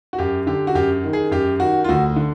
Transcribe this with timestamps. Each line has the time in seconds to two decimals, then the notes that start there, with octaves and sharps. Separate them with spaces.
0.13 F#4
0.18 F#2 G4
0.47 D3 G4
0.67 F#4
0.75 F#2 G4
1.04 D#3
1.13 G#4
1.31 F#2 G4
1.60 D#3 F#4
1.84 F4
1.89 D2 F#4
2.16 D3